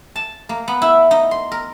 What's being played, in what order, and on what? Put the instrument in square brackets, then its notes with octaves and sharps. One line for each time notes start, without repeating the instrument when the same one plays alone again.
[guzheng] A5
A#3
B3
E4
D#4
C6
A#4